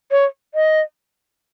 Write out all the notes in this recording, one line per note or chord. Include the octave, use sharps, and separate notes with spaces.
C#5
D#5